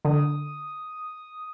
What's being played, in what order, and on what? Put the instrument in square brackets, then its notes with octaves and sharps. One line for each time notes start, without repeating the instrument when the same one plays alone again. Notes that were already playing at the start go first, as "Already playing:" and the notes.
[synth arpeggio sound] D3 [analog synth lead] D#6